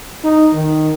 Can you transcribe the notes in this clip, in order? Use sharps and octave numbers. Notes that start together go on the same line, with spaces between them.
D#4
D#3